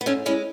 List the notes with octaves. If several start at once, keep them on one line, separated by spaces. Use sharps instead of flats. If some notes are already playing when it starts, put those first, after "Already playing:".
B3
G#2 A3 C#4
G#3 C#4 E4